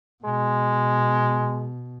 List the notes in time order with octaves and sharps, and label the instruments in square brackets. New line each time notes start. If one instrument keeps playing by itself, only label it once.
[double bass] B2 [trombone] G#3